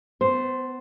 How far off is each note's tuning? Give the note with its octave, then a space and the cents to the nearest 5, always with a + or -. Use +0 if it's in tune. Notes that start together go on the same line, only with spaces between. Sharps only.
B3 +35 C5 +0